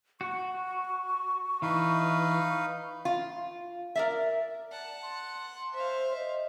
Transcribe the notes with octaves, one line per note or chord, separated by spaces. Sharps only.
F#4 C#6
E3 D#4 B4 F5
F4
A#4 D5 E5
D5 F#5 A5
C6
C5 E5 F5
D#5